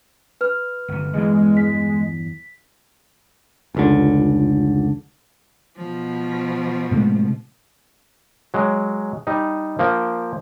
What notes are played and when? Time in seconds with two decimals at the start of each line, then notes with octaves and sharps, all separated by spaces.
0.41 B4 F6
0.88 G1 C3
1.13 E2 G2 E3 G#3
1.57 B6
3.75 F1 C#2 D3
5.77 B2 F3
6.91 A2 C3 G#3
8.54 F#3 G#3
9.27 G3 D#4
9.79 F3 A#3